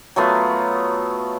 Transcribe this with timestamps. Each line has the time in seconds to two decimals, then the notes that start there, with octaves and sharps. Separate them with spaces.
0.16 F#3 A3 B3 F4